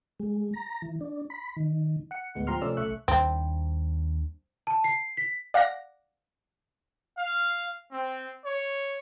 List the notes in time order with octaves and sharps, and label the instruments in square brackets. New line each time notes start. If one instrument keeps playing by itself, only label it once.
[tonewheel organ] G#3
A#5
E3
D4
B5
D#3
[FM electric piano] F#5 C#7
D2 A2 G#3 B3
F3 G4 A#5 C6 F6
C3 F3 A3 C#4 D5 E6
B1 A3 E5 C#6 F#6
[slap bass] D#2 G3 D4 [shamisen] C4
[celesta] A5
C7
B6
[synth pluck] D5 F5 F#5 A#6
[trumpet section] F5
C4
C#5